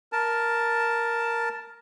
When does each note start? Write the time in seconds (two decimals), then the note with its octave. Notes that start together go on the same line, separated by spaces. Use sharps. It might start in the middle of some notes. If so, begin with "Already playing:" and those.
0.12 A#4 A5